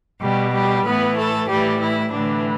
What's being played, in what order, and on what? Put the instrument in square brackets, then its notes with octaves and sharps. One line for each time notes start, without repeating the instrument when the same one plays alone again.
[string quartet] B2 G3 G4
G3 G4
A2 E3 B3 B4
A3 A4
A2 E3 G3 G4
E3 E4
A2 D3 E3 D4